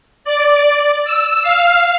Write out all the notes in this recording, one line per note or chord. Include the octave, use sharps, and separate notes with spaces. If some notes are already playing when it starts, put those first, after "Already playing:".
D5
E6
F5